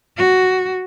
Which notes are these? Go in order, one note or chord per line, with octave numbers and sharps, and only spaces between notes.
F#4